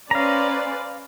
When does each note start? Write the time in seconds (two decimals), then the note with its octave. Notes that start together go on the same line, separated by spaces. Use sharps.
0.11 C#4 B4 C5 D5 F5 A#5